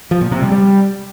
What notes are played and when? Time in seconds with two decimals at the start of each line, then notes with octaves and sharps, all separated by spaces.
0.11 F3
0.21 A#2
0.31 C3
0.41 G3
0.52 G3